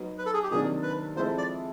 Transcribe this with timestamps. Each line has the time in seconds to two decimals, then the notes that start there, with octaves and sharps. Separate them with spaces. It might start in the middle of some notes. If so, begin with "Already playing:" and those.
Already playing: F#3 B3 D#4
0.18 B4
0.26 A4
0.34 G#4
0.43 G4
0.51 C3 D#3 F#3 A#3 D4 G#4
0.83 B4
1.16 F3 G#3 C4 E4 A4 C5
1.38 D5